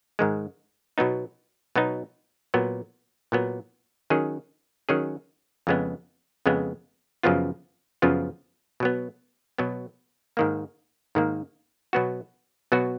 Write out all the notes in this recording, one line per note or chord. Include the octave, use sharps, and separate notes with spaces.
G#2 D#3 G#3
B2 F#3 B3 D#4
B2 F#3 B3 D#4
A#2 F#3 B3
A#2 F#3 B3
D#3 F#3 C#4 G#4
D#3 F#3 C#4 G#4
F2 C#3 G#3 B3
F2 C#3 G#3 B3
F#2 C#3 F3 B3 F4
F#2 C#3 F3 B3 F4
B2 F#3 B3
B2 F#3 B3
G#2 D#3 A#3
G#2 D#3 A#3
B2 F#3 B3 F#4
B2 F#3 B3 F#4